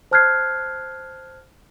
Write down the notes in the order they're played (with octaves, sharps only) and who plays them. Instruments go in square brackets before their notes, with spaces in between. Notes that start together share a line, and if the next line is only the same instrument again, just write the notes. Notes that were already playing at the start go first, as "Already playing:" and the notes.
[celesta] C5 A5 F6 F#6 G#6 C7